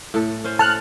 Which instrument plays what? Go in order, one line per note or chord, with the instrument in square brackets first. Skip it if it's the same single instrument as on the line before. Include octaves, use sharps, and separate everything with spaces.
[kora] A2 A4
C#4 C5
[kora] A4 [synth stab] A5 F6 F#6